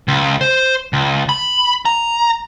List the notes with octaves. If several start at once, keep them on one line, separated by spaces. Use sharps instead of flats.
C#2
C5
C#2
B5
A#5